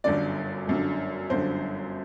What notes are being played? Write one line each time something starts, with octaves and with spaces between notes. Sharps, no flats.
G1 F#2 D3 D5
G1 F#2 D3
G1 F#2 D3 C5